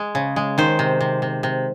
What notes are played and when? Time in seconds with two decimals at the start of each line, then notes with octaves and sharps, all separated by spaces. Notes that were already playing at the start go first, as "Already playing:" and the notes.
Already playing: G#3
0.15 C#3
0.36 G#3
0.58 D#3 C5
0.79 C3
1.01 C3
1.22 C3
1.43 C3